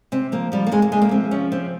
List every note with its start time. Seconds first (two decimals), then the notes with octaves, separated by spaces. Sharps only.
0.12 C3 C4
0.32 F3 A#3
0.52 F3 G3
0.67 A#3
0.72 C3 G#3
0.82 A#3
0.92 C3 G#3
1.02 A#3
1.11 F3 C4
1.31 F3 C#4
1.52 C3 C4